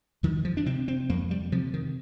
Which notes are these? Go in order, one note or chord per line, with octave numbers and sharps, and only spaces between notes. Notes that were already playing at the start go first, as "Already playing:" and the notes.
F2 D#3
F3
D4
C3 C4
C4
F2 A#3
G3
C3 F3
D#3